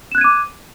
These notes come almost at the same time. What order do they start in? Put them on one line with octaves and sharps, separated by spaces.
E7 F#6 G#6 D#7 D6